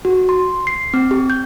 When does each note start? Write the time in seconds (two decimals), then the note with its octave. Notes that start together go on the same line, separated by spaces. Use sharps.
0.05 F#4
0.29 C6
0.67 C7
0.94 C4
1.11 G4
1.30 G6